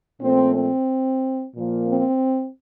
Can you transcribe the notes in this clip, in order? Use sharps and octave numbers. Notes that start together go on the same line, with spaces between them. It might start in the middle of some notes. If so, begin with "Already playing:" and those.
A#2 F3 A3 C4
C4
A#2 F3 A#3
C4